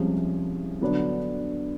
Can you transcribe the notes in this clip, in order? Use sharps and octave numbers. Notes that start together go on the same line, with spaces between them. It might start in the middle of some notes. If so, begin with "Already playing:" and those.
Already playing: C2 C3 F3 G#3 C#4
D3 F#3 B3 D4